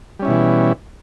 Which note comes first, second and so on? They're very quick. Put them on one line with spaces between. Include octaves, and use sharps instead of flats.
G3 C#4 E4 B2 E3